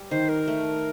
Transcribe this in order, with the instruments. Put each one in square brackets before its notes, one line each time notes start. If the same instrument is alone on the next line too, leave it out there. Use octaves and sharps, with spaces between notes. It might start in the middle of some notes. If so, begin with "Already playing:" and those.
Already playing: [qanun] G3
[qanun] D#3 [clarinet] C5
[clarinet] A#4
[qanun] A3